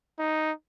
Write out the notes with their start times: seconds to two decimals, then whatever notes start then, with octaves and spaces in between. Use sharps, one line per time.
0.19 D#4